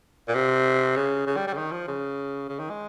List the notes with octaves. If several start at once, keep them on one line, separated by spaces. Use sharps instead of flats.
A#2
C3
C#3
C#3
G3
G3
C#3
D#3
F3
C#3
C#3
D#3
G#3